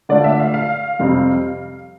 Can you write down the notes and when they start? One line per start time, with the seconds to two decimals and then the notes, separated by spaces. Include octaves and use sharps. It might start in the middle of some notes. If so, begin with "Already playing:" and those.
0.09 D3 A3 D4 F4 D5
0.24 E5
0.40 F5
0.54 F5
0.99 F2 C3 G3 C4